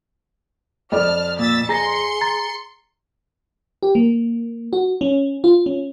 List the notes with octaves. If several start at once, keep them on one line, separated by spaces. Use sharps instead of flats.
F2 D5 A5 F6
A#2 E6 A6 B6
G#4 A#5 C6 A#6 C#7
A#5 A6
G4
A#3
F#4
C#4
F4
C#4